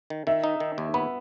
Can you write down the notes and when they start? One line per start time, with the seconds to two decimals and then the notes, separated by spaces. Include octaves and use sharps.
0.10 D#3
0.27 D#3 E5
0.44 D#4
0.60 D#3
0.78 D#2
0.94 B3 B5